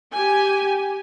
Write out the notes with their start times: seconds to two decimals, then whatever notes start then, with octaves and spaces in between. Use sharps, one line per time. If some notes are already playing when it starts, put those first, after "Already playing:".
0.15 G4 G#5